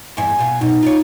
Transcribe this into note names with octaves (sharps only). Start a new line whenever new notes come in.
E2 G2 E4 G#5
B2 F4
F#2 B2 D#4
F4 C#5